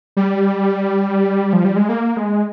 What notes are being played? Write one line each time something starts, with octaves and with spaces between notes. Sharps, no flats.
G3
F3
G3
G#3
A#3
G#3